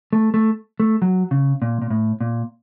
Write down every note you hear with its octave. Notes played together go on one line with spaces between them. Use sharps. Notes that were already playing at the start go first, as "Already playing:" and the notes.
A3
A3
A3
F#3
C#3
A#2
A#2
A2
A#2